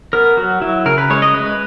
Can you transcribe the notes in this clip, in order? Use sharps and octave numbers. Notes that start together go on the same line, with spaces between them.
B3 A#4
F#3 F#4
F#3 E4
C#3 A#4
B4
G#3 C#5
D#5
G#3 B4